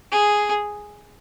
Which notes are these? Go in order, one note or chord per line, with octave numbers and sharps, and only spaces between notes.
G#4